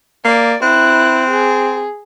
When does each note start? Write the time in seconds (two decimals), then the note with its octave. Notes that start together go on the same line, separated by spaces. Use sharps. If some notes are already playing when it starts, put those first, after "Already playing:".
0.25 A#3 D5
0.62 C4 E4 F#6
1.30 G#4